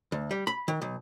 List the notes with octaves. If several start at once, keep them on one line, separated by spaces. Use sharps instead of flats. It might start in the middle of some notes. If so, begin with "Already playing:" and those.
D2
G3
B5
D#3
B1